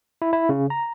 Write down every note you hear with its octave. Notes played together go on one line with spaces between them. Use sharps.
E4
E4
C#3
A#5